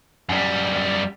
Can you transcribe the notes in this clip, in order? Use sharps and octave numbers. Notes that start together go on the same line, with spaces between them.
F#2 G3